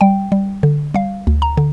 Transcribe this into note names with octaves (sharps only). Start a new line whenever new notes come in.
G3 G5
G3
D3
G3 F5
D2
A#5
D3